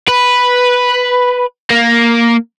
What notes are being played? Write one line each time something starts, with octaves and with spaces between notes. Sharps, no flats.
B4
A#3